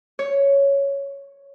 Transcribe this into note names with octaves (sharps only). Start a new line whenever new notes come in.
C#5